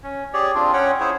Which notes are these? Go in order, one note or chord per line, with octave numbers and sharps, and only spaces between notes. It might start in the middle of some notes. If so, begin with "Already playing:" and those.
C#4
G4 G#4 C#5 D5
C4 D4 F4 G#4
C#4 C#5 F#5 G5
E4 G#4 C5 C#5